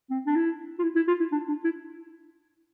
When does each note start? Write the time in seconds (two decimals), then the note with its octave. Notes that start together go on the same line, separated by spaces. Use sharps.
0.10 C4
0.26 D4
0.35 E4
0.79 F4
0.83 E4
0.96 E4
1.08 F4
1.20 E4
1.32 D4
1.49 D4
1.64 E4